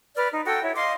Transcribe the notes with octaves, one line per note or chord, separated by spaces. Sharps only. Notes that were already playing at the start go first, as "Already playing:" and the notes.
B4 D5 F6
D#4
F#4 A4 G5
E4 C#5
D#5 F5 C6 D6